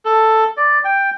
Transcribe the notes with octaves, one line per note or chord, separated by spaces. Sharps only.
A4
D5
G5